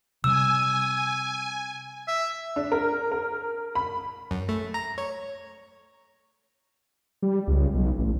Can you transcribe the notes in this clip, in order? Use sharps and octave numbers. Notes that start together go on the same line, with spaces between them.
C3 G3 G#5 E6
E5
D4
A#4
A#4
B5
F#2
A3
A#5
C#5
G3
C#2
B1
A1